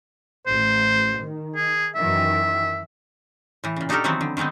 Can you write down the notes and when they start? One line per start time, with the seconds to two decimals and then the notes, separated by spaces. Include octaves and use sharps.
0.47 A1 C5
1.18 D#3
1.55 G#4
1.95 F#2 D#3 E3 E5
3.64 A2 E3
3.76 A#2 C#3
3.89 D4 D#4 F#4 G4 A4 A#4
4.04 D#3 E3 F#3 B3 C4 F#4
4.21 D3
4.37 D#3 G#3 B3 C4 D#4